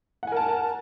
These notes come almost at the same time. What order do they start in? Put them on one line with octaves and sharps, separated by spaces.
F#5 G#5 A#4 A5